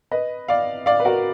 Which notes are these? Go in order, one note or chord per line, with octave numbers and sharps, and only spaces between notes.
B4 D#5
D5 F5
D5 F5
B4
F#4 A#4